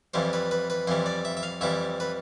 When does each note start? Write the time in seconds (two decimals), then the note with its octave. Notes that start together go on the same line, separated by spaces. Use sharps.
0.14 F2 E3 G3 C5
0.33 B4
0.51 B4
0.70 B4
0.87 F2 E3 G3 C5
1.06 D5
1.25 E5
1.37 E5
1.43 F5
1.61 F2 E3 G3 E5
2.00 B4